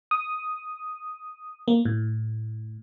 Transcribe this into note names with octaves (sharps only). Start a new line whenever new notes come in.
D#6
A#3
A2